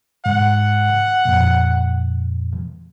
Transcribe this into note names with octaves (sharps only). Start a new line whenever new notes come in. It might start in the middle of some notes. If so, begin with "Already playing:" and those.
G#2 F#5
F2 A#2